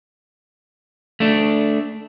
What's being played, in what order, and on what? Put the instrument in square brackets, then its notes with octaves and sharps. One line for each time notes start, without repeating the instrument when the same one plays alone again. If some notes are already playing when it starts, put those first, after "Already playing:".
[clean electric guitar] A3 D4